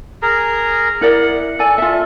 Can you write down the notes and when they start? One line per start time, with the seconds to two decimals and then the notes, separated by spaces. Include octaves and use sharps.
0.22 G#4 A#4 A#5
1.01 E4 A#4 D5 F#5
1.59 A4 D5 G#5
1.78 F4 E5